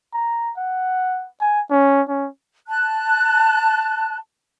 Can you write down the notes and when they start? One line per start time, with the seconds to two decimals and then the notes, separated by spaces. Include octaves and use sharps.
0.13 A#5
0.57 F#5
1.41 G#5
1.70 C#4
2.09 C#4
2.67 A5 F#6